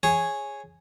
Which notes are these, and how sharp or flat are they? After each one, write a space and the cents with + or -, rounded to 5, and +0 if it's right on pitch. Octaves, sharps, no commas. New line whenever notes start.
G#4 +0 C#5 -5